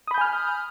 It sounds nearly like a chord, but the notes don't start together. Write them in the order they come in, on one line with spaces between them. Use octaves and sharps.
D#6 B5 G6 G#5 F6